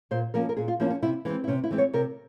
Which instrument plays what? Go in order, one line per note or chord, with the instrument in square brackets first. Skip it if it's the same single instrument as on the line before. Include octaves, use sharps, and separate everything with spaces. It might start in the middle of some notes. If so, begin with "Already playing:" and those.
[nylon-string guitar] A#2 C5
F3 A#3 C#4 A#4
A#4
A#2 G#4
F4
F3 A#3 C#4 E4
C#4
C3 E4
E3 G#3 C4 C#4
E4
C3 C#4
E4
E3 G#3 C4
C#5
C3 A#4